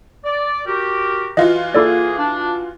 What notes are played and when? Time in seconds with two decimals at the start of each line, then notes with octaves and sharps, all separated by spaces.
0.25 D5
0.67 F#4 G4 A#4
1.37 E3 F4 F#4 D#5
1.75 A#3 E4 G#4 A4 D5
2.19 D4